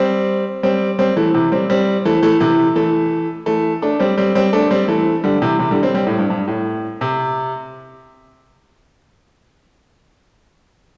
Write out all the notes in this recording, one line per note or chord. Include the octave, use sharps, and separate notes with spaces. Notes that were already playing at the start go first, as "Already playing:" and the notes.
Already playing: G3 C4
G3 C4
G3 C4
E3 A3
C3 E3
G3 C4
G3 C4
E3 A3
E3 A3
C3 E3
E3 A3
E3 A3
A3 D4
G3 C4
G3 C4
G3 C4
A3 D4
G3 C4
E3 A3
D3 G3
C3 E3
C3 E3
D3 G3
G3 C4
G3 C4
A2
G2
G2
A2
C3